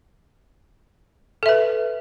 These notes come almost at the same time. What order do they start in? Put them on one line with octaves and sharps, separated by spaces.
A4 E5 B4